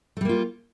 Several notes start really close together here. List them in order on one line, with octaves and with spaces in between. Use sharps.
A3 G3 A#3 F4